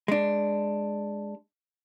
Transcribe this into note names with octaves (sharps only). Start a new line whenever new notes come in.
G#3 D4